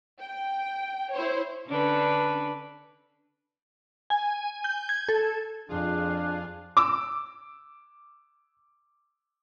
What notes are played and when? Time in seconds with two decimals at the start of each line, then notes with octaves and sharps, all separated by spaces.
0.21 G5
1.13 E4 C5 C#5
1.68 D3 C#4 D4 B4
4.10 G#5
4.64 G6
4.89 G#6
5.09 A4
5.69 F2 D4 F4 G#4 F5
6.77 D6 E6